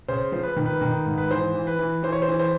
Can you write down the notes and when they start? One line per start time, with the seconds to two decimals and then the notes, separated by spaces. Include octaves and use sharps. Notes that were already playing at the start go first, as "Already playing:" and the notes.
0.08 C#3 C5
0.32 F3 C5
0.43 B4
0.56 D#3
0.66 B4
0.82 D#3
1.06 G#2
1.18 B4
1.31 E3 C5
1.54 E3
1.67 B4
1.79 E3
2.03 E3 C5
2.12 C#5
2.22 C5
2.28 E3
2.39 C5